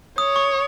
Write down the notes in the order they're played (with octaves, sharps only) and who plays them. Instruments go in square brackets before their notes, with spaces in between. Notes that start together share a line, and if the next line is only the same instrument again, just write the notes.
[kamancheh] C#5 [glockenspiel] D#6
[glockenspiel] C#6